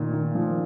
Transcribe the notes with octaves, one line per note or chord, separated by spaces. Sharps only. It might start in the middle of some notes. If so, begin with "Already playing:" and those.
Already playing: A#2 D#3
D#3
F3